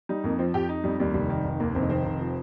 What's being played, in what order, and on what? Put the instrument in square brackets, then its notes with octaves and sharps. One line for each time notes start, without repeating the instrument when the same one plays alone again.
[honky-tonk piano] G3 [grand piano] D#4
[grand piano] F2 [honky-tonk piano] A#3
[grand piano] F3 [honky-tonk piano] C4
[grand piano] F2 [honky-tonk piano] G4
[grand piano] D#4
[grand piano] F2 [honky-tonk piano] G3
[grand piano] D#2 [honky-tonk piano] G3
[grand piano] F1 [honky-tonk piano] G3
[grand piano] D#3
F1
[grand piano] D#2 [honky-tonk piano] A#3
[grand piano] F1 [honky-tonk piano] C4
[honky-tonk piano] D#4
[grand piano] D#3 [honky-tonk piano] C4
[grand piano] F1
F3